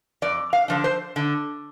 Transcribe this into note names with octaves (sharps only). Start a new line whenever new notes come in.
F2 D5
F5
D3 F3 D4
C5
D3